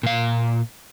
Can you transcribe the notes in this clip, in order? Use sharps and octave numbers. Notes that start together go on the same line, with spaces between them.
A#2 F5